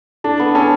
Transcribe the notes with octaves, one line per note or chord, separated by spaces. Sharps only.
D4 A4
B3
C#4 A4